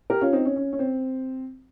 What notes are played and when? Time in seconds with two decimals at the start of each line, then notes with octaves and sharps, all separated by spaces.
0.10 G4 A#4
0.21 C#4 F4
0.33 C4 D#4
0.45 C#4
0.56 C#4
0.73 C#4
0.79 C4